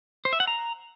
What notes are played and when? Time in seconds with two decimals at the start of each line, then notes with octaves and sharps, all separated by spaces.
0.25 C5
0.33 E5
0.40 F#5
0.47 A#5